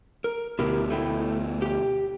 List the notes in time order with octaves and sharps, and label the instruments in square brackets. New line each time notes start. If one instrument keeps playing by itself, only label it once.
[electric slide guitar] A#4
[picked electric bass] D2 B2 [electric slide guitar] E4 G4 A#4
[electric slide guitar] A3 E4 G5
G4 G5